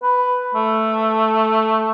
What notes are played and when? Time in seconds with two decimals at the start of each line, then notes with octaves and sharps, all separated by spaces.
0.03 B4
0.55 A3